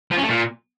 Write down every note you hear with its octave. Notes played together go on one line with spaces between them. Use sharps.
F3
C#4
A3
A#2